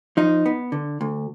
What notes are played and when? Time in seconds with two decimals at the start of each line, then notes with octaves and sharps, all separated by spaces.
0.17 F3 D#4
0.46 B3
0.72 D3
1.01 D2